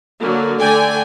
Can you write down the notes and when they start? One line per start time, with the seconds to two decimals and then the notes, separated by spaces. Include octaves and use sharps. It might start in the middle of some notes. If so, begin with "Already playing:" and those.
0.20 D3 F#3 A#3
0.60 D3 A3 D5 G5 G#5